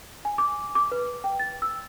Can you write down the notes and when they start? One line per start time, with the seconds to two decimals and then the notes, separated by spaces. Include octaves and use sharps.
0.25 G#5
0.38 D6
0.75 D6
0.92 B4
1.24 G5
1.39 A6
1.62 E6